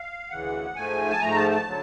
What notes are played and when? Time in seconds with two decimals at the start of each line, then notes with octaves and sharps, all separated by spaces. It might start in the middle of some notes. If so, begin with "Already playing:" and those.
Already playing: F5
0.30 D2 C#3 E3 F#5
0.76 G#2 F3 A3 G#5
1.10 A5
1.20 G#2 F3 A3 A#5
1.35 A5
1.51 A5
1.67 D3 F#3